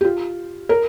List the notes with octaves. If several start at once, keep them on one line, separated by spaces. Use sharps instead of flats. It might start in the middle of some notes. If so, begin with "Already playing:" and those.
G4
F4
A#4